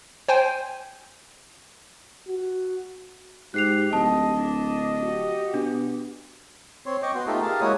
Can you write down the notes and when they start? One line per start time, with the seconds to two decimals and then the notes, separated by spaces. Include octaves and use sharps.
0.29 C5 G5 G#5
2.28 F#4
3.54 G#2 G4 F#6 C7 F7
3.93 D1 D#5 A5
4.35 D4
5.04 F#4 G4
5.54 B2 D4
6.86 C4 C#5 C6
7.03 D#5 G5 C#6 D6
7.15 B3 F#4 C6
7.27 A3 D#4 F4 G4 A4
7.42 G4 G#4 A#4 F5 A5
7.61 G#3 A#3 E4 F#4 C#5 D#6